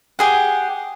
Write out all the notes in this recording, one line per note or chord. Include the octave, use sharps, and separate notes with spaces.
G4 G#4 F#5